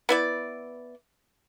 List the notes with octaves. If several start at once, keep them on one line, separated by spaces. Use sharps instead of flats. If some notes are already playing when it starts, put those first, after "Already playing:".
B3 E4 D5